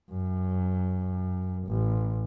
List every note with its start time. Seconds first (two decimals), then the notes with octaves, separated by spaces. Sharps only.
0.11 F#2
1.68 A1